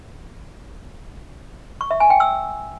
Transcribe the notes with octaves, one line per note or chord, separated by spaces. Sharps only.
C#6
E5
G#5
G5
E6